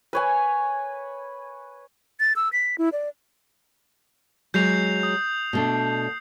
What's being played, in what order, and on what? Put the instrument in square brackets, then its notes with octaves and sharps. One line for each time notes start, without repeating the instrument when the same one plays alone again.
[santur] B4 C#5 G#5
[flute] A6
E6
B6
E4
D5
[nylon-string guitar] F#3 G#3 [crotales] G6 C7 F7
[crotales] D#6
[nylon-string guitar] B2 A3 D4